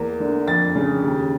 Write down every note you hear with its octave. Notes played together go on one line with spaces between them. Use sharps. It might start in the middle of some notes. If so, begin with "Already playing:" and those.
Already playing: E2 A#3
D3
F2 A6
C#3
D#2